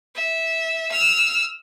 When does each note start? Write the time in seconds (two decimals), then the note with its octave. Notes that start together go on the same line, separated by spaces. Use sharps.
0.15 E5
0.92 E6 F6